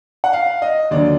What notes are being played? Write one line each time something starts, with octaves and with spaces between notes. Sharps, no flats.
F#5
F5
D#5
D#2 D3 F#3 D5